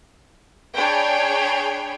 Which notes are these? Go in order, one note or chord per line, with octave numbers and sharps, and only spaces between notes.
D4 G#4 C#5 G5 G#5 B5